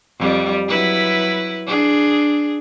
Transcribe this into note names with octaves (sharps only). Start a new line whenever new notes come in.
F2 G3
F#3 E4 B4
D4 G#4